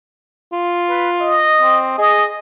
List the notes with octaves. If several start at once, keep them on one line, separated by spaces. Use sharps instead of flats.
F4
B4
D#5
C4
G#4 D#5